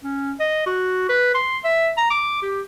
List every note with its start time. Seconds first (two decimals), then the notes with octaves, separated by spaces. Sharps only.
0.03 C#4
0.40 D#5
0.66 F#4
1.09 B4
1.35 C6
1.64 E5
1.98 A#5
2.10 D6
2.43 G4